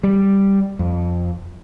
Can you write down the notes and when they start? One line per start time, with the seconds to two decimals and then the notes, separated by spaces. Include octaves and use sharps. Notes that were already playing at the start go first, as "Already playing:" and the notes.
0.03 G3
0.79 F2